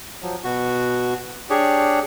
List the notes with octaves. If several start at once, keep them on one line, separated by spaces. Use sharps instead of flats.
F3 F#3
B2 F#4
D4 G4 G#4 C#5